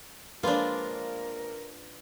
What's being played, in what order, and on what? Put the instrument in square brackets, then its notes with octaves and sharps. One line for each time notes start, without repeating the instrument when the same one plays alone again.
[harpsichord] F3 G#3 A#3 [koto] D4 F4 [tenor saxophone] A#4 [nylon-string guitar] B4